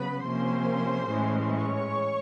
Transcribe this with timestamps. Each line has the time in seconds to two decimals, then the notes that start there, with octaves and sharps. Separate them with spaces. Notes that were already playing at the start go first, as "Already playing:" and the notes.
Already playing: C#3 F#3 B3 B4 B5
0.25 C3 F3 A#3 C#4 C5 C6
1.09 A2 E3 G#3 C#4
1.51 C#5 C#6